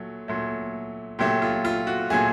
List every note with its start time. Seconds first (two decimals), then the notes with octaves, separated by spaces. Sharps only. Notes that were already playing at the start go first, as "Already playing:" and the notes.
Already playing: A#2 F#3 A3
0.28 A#2 F#3 A3
1.19 A#2 F#3 A3 G4
1.42 F4
1.65 F4
1.87 F#4
2.10 A#2 F#3 A3 G#4